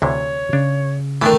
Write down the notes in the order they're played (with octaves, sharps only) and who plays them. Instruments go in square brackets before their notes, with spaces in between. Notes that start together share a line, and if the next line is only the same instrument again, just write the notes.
[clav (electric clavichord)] D2 C3 E3 [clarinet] C#5
[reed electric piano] C#3 [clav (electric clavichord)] D4
[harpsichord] D#3 A3 [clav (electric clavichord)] E3 B3 D4